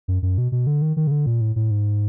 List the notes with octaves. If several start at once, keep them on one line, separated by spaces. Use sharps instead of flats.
F#2
F#2
B2
B2
D3
D#3
D#3
C#3
D3
A#2
A2
A2
G#2